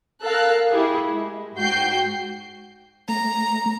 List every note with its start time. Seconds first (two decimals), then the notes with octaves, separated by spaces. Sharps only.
0.23 A4 A#4 F5 F#6
0.70 E4 G4 G#4
1.08 G#3
1.58 G#2 F#4 G5 G6 C7
3.09 A3 A#5